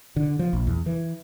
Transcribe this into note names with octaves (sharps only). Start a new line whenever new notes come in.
D3
F3
A#1
E2
E3